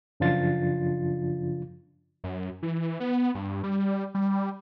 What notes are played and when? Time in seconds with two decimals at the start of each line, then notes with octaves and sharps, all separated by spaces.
0.20 F#2 C#3 F3 D4 F4 A6
2.24 F#2
2.63 E3
3.00 B3
3.35 G2
3.63 G3
4.15 G3